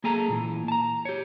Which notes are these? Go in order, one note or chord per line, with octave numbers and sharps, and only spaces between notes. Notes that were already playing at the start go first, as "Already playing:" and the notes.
A#3 G#4 A4 G#5 A#5
A#2 E3
A5 A#5
G4 C#5